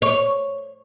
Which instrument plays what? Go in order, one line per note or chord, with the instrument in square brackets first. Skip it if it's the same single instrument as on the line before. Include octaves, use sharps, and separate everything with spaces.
[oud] C#5